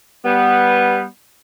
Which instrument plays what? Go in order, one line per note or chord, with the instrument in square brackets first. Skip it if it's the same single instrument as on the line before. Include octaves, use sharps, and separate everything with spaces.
[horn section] G3 B3